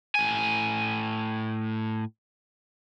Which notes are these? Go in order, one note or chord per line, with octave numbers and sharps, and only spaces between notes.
A2 G#5